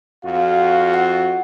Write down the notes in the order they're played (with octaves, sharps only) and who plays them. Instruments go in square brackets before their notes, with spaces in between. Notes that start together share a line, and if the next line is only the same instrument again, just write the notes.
[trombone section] F2 F4 F#4 [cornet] F5
[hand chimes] F#5